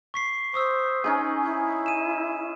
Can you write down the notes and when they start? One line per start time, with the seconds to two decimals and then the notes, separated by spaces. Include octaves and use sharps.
0.14 C#6 B6 C7
0.54 C5 C#6 D#6 E6
1.04 C#4 D#4 G#4 G#5
1.43 E4
1.86 D#7 E7